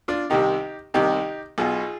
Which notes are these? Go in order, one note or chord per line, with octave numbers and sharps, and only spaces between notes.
D4 F4
C2 C3 D#3 D#4 G4
C2 C3 D#3 D#4 G4
B1 B2 F4 G#4